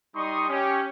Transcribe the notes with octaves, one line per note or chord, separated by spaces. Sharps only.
G3 D#4 D#5 C6 C#6 D#6
C#4 G4